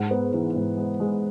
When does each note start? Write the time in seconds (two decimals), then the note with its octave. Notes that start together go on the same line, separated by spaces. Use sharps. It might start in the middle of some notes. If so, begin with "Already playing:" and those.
Already playing: G#2 F#5
0.11 B3
0.34 E3
0.56 G#2
0.77 G#3
1.00 G#3